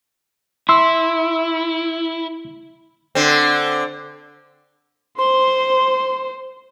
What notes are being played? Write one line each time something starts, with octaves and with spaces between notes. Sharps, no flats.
E4 C6 E6
D3 C4
C5 C6